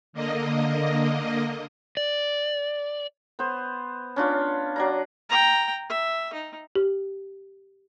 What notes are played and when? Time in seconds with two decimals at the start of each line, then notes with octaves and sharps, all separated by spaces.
0.13 D3 A#3 D#5
1.97 D5
3.39 B3 C5
4.16 C#4 D4 F4
4.76 F#3 D5 A#5
5.30 G5 A#5
5.90 E5
6.33 D#4
6.75 G4